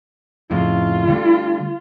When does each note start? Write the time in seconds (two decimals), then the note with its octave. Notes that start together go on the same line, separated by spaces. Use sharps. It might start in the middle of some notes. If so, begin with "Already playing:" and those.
0.51 F2 A2 C#3 F4
1.08 D3 G3 A3